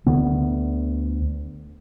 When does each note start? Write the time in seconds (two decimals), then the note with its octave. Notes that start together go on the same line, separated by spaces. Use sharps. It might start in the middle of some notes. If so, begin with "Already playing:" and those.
0.06 D2 D3 B3